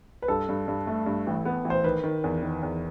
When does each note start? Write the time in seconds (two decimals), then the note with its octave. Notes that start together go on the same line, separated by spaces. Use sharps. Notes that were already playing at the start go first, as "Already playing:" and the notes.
0.22 B4
0.28 G2 A4
0.49 G2
0.68 G2
0.87 A3
1.06 G2
1.27 A1
1.45 B3
1.65 A1
1.70 C5
1.84 D#3 B4
2.04 D#3
2.24 E2
2.43 D#3
2.63 E2